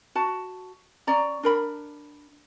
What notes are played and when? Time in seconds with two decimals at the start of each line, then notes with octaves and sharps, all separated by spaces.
0.15 F#4 A5
1.07 C#4 D5 A#5
1.43 D4 A#4 B5